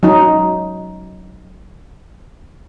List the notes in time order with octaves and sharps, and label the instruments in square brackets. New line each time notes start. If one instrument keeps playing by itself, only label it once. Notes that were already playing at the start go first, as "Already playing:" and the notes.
[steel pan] F#3 D#4